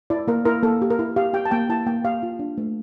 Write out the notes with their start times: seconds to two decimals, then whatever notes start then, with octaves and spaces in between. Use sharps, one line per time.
0.10 E4 D5
0.28 A#3 A#4
0.45 E4 A#4
0.63 A#3 A4
0.82 G4
0.90 A#4
0.99 E4
1.16 G4 F5
1.33 G4 G5
1.45 A5
1.51 A#3 G5
1.69 E4 A5
1.86 A#3 G5
2.05 G4 F5
2.23 F4
2.39 D4
2.58 A3